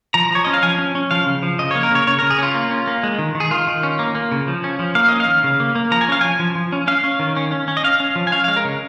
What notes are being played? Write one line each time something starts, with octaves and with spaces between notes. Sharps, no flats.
F3 A#5
F3 C#5
C#4 D#5
F5
F3 G#5
C#4
C#4
F3 F5
C#3
F3
C#3 D#5
A#3 C#5
A#4
C#3 C#5
C#3 C#5
C#3 A#4
G#4
C#4 F4
A#3
C#4
A#3
G#3
D#3
D#3
G#4
D#3 F4
D#3
C#4
A#3
A#3
C#3
F3
C#4
F3
A#3 F5
C#4 D#5
F5
D#3
C#3
A#3
A#3
F3 A#5
G#5
C#4 F5
F3 G#5
F3
F3
C#4
C#4 F5
C#4
D#3
C#4
C#4
C#4
D#5
C#4 F5
C#4
F3
G#5
C#4 F5
G#3 F5
A#4
C#3